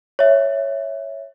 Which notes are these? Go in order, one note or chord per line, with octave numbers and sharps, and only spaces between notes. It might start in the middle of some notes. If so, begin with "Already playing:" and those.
C#5 E5